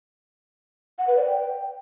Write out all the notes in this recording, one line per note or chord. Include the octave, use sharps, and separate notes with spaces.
F#5
B4
D5
G5